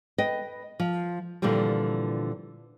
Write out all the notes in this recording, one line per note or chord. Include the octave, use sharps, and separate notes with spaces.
B4 D#5 G5
F3
A#2 D3 E3 F3 G3